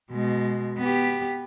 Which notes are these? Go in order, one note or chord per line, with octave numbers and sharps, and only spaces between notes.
B2 G#3
B3 G4